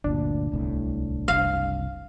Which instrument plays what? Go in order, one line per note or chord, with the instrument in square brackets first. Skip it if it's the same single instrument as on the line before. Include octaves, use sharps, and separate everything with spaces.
[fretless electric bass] G1 D2 A#2 [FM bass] D4
[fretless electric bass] D1 C2 A2
[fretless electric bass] F#1 C2 [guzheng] F5